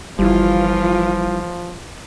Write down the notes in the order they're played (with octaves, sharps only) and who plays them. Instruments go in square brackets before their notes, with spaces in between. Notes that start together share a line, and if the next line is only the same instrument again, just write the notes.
[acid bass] G1 [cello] E3 F4 [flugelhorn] F3 [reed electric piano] G3 E4